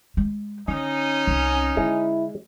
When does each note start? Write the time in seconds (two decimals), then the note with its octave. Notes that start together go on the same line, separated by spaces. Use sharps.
0.17 G#3
0.68 D3 C#4 D#4
1.27 C2
1.77 D3 G#3 E4